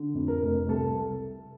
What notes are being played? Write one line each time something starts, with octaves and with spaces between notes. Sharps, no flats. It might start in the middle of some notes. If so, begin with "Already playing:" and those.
Already playing: D3
F2
A#4
F1
C2 A4